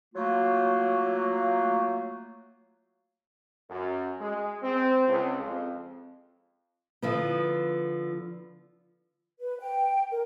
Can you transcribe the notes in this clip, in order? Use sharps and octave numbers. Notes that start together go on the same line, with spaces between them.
F#3 A3 A#3 F4
F#2
G#3
C4
C#2
F2
D3 F3 B3
B4
G5
A#4